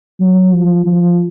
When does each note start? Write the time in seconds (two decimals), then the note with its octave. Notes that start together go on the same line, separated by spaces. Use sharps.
0.20 F#3
0.52 F3
0.86 F3